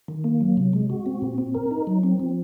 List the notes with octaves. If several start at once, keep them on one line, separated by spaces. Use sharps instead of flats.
D#3
A#3
F#3
C3
G#3
F#4
C4
A#2
C4
A#4
D#4
F#3
C4
F3